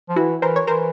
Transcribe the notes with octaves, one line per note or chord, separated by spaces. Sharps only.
F3
E3 E4 F#4
E3 A#4 C5
C#5
E3 A#4 C5